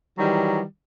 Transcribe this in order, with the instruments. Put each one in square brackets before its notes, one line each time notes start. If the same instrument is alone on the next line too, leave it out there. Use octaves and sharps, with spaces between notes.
[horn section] D#3 E3 F#3 G3